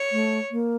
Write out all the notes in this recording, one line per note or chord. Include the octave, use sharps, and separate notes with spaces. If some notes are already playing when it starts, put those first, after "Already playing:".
Already playing: C#5
A3
A#3